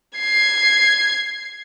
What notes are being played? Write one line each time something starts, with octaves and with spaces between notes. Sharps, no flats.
G#6 C7